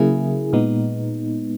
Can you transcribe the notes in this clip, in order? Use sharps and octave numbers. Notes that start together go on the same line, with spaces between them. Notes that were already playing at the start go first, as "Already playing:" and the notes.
Already playing: C#3 F#3 A#3 E4 G#4
A#2 G#3 B3 D#4